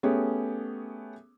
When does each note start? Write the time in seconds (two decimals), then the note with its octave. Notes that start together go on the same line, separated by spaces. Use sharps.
0.03 A3 B3 C#4 G4 G#4